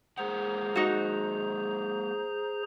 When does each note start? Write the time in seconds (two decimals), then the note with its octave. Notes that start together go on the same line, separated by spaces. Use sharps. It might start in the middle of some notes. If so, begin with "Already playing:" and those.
0.18 G#3 A#3 G#4 C5 F#5 A#5
0.75 D#4 F#4